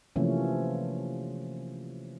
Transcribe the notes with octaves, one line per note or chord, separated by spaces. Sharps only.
C3 E3 F3 A3 A#3 C#4